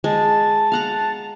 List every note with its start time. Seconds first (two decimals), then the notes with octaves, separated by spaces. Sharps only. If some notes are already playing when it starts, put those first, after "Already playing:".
0.04 G#3 A5
0.72 F5 F#5 A#5